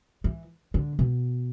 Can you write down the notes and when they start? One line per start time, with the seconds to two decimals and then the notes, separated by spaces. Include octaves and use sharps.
0.24 E3
0.74 D3
0.99 B2